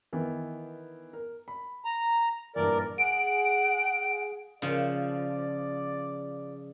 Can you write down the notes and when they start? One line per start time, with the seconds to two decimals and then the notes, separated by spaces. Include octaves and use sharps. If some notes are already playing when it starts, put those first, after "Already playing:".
0.13 D#3 E3 B3
1.13 A#4
1.48 B5
1.85 A#5
2.56 G2 A#2 E3 A#4 D5
2.98 G#4 F#5 D7
4.62 C#3 F3 D5